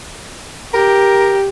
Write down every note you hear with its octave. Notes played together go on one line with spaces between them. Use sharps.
G4 A#4